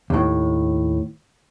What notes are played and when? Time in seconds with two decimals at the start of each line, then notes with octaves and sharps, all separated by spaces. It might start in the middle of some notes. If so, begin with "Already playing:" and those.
0.10 D#2 A2